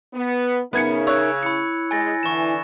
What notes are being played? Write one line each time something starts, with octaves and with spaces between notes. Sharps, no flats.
B3
C#3 B3 D#4 A#4 E5 G#6 C#7
C#5 E6 F#6 G#6
E4 B5 C#7
G#3 G#5 A6 A#6
D3 E3 C#6 E7